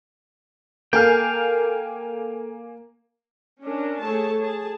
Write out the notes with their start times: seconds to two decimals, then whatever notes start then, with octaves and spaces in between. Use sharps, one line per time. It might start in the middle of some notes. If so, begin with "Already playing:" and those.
0.93 A#3 A4 A#4 F5 G5 G#5 F6
3.61 C#4 D4 A#4
4.02 A3 G#4 A4 C#5 A5
4.41 G#4 A5